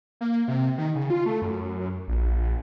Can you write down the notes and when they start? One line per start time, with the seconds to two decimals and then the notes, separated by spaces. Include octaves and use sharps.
0.21 A#3
0.48 C3
0.78 D#3
0.95 C#3
1.10 F4
1.26 A3
1.42 F#2
2.08 A#1